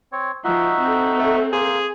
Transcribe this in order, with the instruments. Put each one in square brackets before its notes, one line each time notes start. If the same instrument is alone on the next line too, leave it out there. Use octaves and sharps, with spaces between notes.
[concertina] C4 C#5
[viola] F3 [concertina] D#4 F#4 E5
[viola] C4 A4
[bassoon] A3
[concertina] A#3 C5 [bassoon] G#4